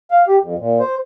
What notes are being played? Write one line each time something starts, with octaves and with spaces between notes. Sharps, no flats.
F5
G4
F2
A#2
C5